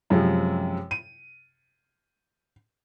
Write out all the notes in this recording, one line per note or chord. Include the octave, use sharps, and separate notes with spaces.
F#2 C3 F3 G#3
D#7